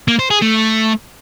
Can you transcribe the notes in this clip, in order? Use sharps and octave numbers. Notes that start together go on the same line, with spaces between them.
A#3
C5
G#4
A3